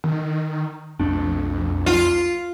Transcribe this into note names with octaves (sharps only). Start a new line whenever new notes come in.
D#3
B1 F2 A3 D4
F4